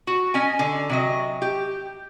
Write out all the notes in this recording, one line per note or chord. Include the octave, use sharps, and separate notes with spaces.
F#4
C#4 D#5 G#5
D3
C3 F#3 D#5
G4